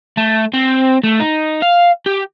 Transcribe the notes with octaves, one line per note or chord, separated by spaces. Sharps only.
A3
C4
A3
D#4
F5
G4